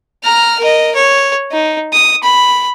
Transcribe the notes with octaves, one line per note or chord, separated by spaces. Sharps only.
A#5 F6
A#4 D#5
C#5
D#4
D#6
B5